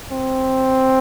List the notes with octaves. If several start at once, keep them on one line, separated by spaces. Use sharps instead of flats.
C4